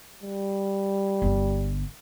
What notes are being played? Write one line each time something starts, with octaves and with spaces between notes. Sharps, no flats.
G3
G1 D3